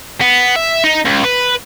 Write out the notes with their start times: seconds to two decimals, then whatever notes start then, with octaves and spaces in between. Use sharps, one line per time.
0.21 B3
0.56 E5
0.84 D#4
1.05 C#2
1.24 B4